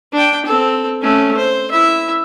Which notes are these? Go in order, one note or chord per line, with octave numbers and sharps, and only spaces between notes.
D4 G5
C4 A4
A3 C#4
C5
E4 E5